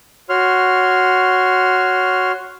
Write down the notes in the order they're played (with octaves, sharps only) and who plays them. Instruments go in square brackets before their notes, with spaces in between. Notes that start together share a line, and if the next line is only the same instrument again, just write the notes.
[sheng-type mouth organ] F#4 C#5 C6 F6